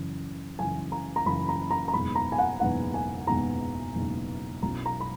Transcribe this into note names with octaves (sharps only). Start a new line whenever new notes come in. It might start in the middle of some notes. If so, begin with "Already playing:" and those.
Already playing: F#2 C#3 E3
F#2 C#3 E3 G#5
A#5
A#5
F#2 C#3 E3 B5
A#5
A#5
A#5
F#1 E2 B2 G#3 D#4 B5
A#5
G#5
F#5
F#1 E2 B2 G#3 D#4 F#5
G#5
F#1 E2 B2 G#3 D#4 A#5
F#1 E2 B2 G#3 D#4
B1 B2 F#3 C#4 E4 A#5
A#5
B5